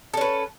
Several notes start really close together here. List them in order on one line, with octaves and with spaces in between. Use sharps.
A4 C#4 B4